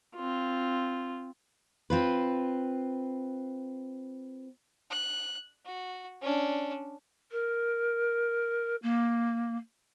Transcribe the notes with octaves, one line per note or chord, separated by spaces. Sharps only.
C4 F4
C4 F4 B4
F#6
F#4
C#4 D4
A#4
A#3